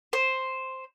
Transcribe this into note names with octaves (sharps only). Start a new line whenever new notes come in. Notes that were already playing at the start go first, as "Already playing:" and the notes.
C5